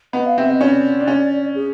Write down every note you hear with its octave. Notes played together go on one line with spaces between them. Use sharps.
B3 D#5
F5
C4 E5
D#5
C#4 D5
D4
C#4
G#4